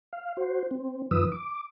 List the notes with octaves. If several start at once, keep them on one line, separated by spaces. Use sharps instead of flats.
F5
F#4 C5
C4
F#2 D#3 F3 B4 D#6 E6
D6